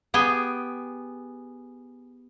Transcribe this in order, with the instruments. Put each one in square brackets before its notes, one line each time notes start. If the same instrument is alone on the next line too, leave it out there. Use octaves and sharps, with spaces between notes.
[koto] B3 G4 G#4 G5 G#5